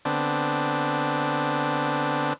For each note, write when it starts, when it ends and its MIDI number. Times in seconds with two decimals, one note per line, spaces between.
0.05 2.33 50
0.05 2.33 59
0.05 2.33 60
0.05 2.33 62